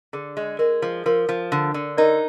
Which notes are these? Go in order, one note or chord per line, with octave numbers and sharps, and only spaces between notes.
D3 G#4
G#3
G#3 A#4
F3
F3 A#4
F3
D3
D3
D#4 A#4 D5